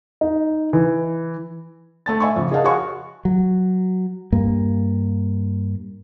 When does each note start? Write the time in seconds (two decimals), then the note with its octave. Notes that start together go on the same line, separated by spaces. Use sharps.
0.21 D#4
0.73 E3
2.06 A3 A5 A6
2.20 E5 G#5 C#6
2.36 F2 C#3
2.51 G#4 A#4 D#5 F5 F#5 A5
2.64 F#4 G#4 C#5 F5 G#5 C#6
3.25 F#3
4.32 G2 A#3